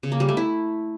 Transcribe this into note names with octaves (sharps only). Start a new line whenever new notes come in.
C#3
A#3
G3
A3
E4